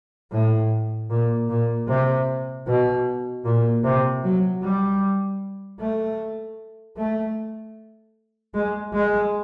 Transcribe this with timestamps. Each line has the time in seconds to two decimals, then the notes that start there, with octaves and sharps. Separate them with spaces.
0.31 A2
1.10 A#2
1.49 A#2
1.88 C3
2.67 B2
3.45 A#2
3.84 C3
4.23 F#3
4.62 G3
5.80 A3
6.97 A3
8.54 G#3
8.93 G#3